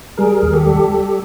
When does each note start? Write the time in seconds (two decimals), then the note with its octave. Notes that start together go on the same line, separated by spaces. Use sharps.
0.17 G3 G#4 A#4
0.42 D#2
0.54 G4 A4
0.66 G3
0.90 G3